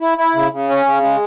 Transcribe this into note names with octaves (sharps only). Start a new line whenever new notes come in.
E4
E4
C#3
C#3
C#4
C#3
G#3